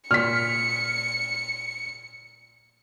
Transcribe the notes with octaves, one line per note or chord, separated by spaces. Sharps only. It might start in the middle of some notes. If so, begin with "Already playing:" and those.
A#2 F6 B6 C#7